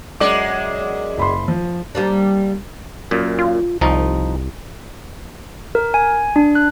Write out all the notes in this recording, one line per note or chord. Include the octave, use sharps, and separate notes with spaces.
F#2 G#3 D5 D6
F#1 B5 C6
F3
G3 A#3 D4
F#2 A#2
F4
C2 F3 D#4
A#4
G#5
D4
F#6